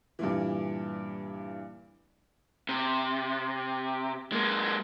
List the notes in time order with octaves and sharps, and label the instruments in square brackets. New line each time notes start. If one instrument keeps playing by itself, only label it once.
[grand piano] G2 A#2 E3
[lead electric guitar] C3
G#3 A#3